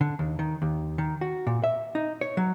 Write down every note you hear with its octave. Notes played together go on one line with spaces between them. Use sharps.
D3
D#2
D#3
D#2
D#3
F#4
A#2
E5
D#4
C#5
F#3